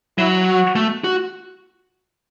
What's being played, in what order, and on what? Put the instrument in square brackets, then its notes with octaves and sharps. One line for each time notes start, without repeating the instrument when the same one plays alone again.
[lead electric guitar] F#3 [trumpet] E4
[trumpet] F#4
[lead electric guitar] A3
F#4